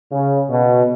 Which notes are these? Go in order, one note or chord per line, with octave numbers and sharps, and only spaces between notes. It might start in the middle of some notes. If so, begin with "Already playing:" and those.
C#3
B2